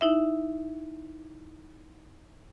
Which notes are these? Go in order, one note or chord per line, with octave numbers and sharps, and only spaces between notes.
D#4 E4 E5